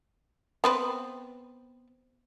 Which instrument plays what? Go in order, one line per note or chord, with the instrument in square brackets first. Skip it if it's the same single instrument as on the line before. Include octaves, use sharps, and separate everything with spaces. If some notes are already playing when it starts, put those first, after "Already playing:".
[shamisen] B3 C4 B4